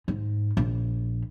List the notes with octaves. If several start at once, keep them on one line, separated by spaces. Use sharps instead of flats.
G#2
A#1